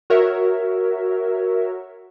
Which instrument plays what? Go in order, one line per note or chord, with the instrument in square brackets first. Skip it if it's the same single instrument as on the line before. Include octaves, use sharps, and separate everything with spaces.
[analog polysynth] F#4 A#4 C#5 E5